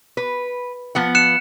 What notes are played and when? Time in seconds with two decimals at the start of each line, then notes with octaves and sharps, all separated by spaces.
0.17 B4
0.95 F3 B3 F#5
1.15 F#6 C#7 E7